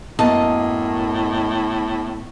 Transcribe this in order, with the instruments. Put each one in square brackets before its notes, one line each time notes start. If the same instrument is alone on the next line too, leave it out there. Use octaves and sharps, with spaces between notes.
[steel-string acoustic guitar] F#2 A#3 D#5 [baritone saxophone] A2 [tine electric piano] B3 [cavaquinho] A5